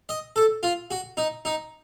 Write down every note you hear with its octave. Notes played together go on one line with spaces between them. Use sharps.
D#5
A4
F4
F#4
D#4
D#4